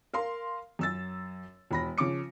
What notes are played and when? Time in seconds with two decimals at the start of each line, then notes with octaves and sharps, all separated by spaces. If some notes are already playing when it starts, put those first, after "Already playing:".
0.14 A#4 F5 C6
0.79 F#2 E6 A6
1.71 E1 B5 A#6
1.98 C#3 F3 D6 C#7